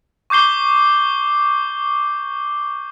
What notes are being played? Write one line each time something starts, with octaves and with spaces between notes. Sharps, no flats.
C#6 D6 G6 C7 G7